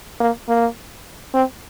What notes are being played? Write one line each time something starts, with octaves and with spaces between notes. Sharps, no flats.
A#3
A#3
C4